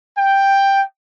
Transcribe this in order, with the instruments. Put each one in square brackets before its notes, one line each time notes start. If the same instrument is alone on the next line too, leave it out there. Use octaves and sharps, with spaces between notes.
[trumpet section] G5